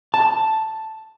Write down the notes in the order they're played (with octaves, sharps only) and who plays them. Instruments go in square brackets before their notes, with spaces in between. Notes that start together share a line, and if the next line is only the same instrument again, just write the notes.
[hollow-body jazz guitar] A5